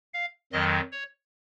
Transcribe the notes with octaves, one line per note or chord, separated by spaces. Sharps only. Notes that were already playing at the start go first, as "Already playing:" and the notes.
F5
F2 D#3 F#3 D#5
C#5